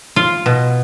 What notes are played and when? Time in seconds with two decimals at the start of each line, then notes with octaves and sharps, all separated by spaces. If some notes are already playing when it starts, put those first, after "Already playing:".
0.16 F4
0.46 B2